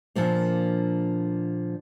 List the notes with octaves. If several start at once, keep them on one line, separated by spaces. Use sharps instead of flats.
A#2 D3 F3 A#3